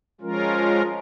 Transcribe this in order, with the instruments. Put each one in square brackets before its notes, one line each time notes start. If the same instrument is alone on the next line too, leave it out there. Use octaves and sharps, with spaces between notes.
[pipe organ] F3 G#3 C#4 F4 A#4